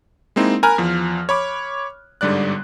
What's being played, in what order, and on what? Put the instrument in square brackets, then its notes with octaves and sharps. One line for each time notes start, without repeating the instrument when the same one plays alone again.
[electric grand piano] G#3 A#3 C4 D#4 E4
A#4 G#5 A#5 B5 F6 F#6
E2 F3
C#5 B5 D6
G1 G#2 D3 G3 D5 F#6